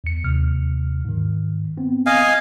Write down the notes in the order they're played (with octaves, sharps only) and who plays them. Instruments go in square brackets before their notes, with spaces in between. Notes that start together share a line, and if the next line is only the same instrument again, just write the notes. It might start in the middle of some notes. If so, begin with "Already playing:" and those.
[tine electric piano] E2 C#7
D#2 C3 F6
G#2 D#3
B3 C4
[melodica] D#5 F5 G#5